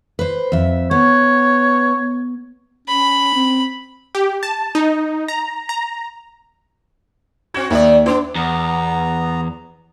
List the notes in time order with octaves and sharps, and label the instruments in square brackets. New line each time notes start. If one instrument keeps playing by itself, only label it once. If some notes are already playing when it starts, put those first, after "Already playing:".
[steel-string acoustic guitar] B4 C5
F2 E5
[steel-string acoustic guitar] B3 [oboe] C#5
[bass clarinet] C#4 [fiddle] B5
[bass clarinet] C4
[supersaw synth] G4
A5
D#4
A#5
A#5
[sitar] C4 F#4 [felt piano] G#6
[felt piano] D#2 E5 [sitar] D#3 D5
[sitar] B3 [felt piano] D4
[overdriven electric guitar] E2 [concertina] B3 A#5